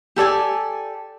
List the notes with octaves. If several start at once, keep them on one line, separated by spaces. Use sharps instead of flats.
G4 A4 D5 G#5